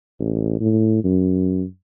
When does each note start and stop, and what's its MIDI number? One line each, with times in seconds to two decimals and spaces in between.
0.20 0.59 33
0.60 1.03 45
1.04 1.64 42